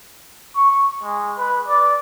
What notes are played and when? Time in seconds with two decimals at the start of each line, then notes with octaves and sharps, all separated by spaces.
0.56 C#6
1.03 G#3
1.38 B4
1.68 D5